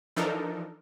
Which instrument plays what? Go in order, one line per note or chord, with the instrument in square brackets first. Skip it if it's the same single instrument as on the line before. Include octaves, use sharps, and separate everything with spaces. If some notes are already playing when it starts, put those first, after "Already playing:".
[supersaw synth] E3 F3 D4 D#4 A4 A#4